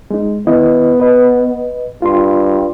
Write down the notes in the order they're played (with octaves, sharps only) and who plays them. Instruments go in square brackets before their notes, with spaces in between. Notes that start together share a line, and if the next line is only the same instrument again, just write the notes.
[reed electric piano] G#3 D#4
[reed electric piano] D#3 E4 D#5 [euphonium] B3
[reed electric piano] B4 D#5
[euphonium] G2 [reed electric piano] F4 C6